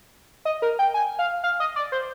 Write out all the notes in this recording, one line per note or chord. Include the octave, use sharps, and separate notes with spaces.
D#5
A#4
G5
G#5
F5
F5
D#5
D5
C5